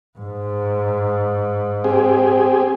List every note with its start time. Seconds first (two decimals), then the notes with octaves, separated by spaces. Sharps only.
0.19 G#2
1.84 C4 G4 G#4